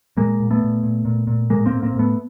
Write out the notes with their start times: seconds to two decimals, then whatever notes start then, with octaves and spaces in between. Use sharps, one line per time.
0.17 A#2 G#3 A#3
0.40 A#2
0.51 A3 B3
0.62 A#2
0.83 A#2
1.05 A#2
1.27 A#2
1.50 A2 G#3 A#3
1.66 A#3 C4
1.72 A2
1.83 A#3 C4
1.93 A2
1.99 A3 B3